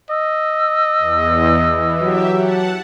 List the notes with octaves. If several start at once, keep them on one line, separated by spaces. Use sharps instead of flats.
D#5 E6
E2
E3
F#3 G4 E5
F#5 A5